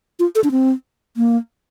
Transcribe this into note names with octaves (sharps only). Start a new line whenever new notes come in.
F4
A4
D4
C4
A#3